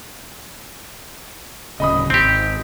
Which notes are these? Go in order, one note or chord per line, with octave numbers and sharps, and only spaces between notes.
D1 C#3 D#5 B5 D#6
G#1 C4 G4